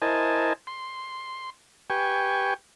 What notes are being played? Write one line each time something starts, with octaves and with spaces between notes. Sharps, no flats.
E4 A#4 C5 D#5 G#5 A5
C6
G4 B4 G5 G#5 C#6